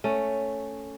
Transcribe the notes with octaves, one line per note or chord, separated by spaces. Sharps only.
A3 C#4